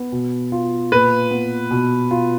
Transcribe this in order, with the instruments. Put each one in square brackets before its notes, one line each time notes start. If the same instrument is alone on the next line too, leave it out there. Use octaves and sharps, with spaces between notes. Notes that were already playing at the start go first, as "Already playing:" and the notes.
Already playing: [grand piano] B3
B2
F4
[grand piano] A#2 [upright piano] B4
[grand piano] B3
B2
F4